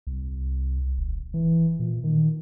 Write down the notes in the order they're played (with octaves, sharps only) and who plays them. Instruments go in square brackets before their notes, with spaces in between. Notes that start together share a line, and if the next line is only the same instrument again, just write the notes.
[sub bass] C2
D#1
E3
A#2
D#3